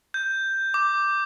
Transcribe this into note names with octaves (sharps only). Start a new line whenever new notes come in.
G6
D6